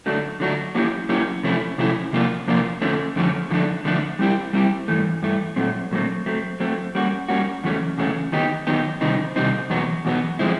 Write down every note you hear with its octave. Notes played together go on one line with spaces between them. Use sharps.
D3 F#3 A3 D4 F#4
D3 F#3 A3 D4 F#4
F#3 A#3 C#4 E4 G4
F#3 A#3 C#4 E4 G4
C3 F3 A3 C#4 E4
C3 F3 A3 C#4 E4
C3 F3 A#3 D4 F4
C3 F3 A#3 D4 F4
F2 D3 F3 A3 C#4
F2 D3 F3 A3 C#4
D3 F3 A3 D4
D3 F3 A3 D4
G3 C4 E4 G4
G3 C4 E4 G4
G2 E3 A3
G2 E3 A3
A#2 F#3 A3 C4
A#2 F#3 A3 C4
F#3 A3 C4
F#3 A3 C4
G3 A#3 C#4 F#4
G3 A#3 C#4 F#4
E2 C#3 F#3 A3 C#4
E2 C#3 F#3 A3 C#4
D#3 F#3 B3 D#4 G4
D#3 F#3 B3 D#4 G4
C3 D#3 G3 C4 D#4
C3 D#3 G3 C4 D#4
E2 B2 F#3 B3
E2 B2 F#3 B3
F3 G#3 C4 E4